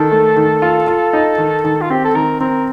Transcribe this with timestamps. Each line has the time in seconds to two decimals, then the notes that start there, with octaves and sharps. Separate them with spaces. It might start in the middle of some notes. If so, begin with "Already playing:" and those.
Already playing: D#3 A4
0.12 A3
0.36 D#3
0.62 F4
0.87 F4
1.13 D#4
1.38 D#3
1.64 D#3
1.81 F4
1.90 C4 G4
2.05 A4
2.15 D#3 A#4
2.40 C4 A#4